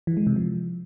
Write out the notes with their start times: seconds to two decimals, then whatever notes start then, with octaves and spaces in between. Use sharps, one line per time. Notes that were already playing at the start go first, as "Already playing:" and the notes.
0.07 E3
0.17 G#3
0.27 C3
0.36 F3